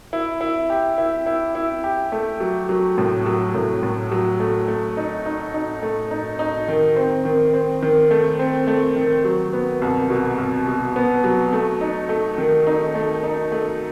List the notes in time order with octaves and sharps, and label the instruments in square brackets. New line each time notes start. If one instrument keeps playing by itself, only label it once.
[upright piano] E4
E4
G4
E4
E4
E4
G4
A3
F#3
F#3
A2
F#3
A2
A2
F#3
A3
A3
D#4
D#4
D#4
A3
D#4
D#4
D#3
C4
D#3
C4
D#3
A3
C4
A3
D#3
F#3
B3
C2
B2
C2
B2
B3
F#3
A3
D#4
A3
D#3
D#4
A3
D#4
A3